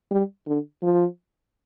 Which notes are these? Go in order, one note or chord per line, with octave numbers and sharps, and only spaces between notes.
G3
D3
F3